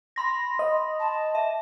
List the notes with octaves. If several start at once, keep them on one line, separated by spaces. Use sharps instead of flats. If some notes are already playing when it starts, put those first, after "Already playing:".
B5 C6 A#6
D#5
A5
E5